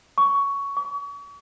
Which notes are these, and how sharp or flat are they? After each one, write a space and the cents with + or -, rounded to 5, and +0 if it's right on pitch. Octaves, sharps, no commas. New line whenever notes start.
C#6 +10
C#6 +40